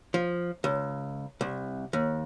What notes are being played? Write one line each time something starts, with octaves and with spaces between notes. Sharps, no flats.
F3
C#2
C2
D#2